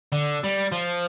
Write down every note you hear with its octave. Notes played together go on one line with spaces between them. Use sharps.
D3
G3
F3